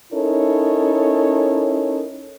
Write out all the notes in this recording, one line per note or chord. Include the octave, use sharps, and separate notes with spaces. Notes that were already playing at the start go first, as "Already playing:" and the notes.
C#4 D#4 E4 A4 A#4 C#5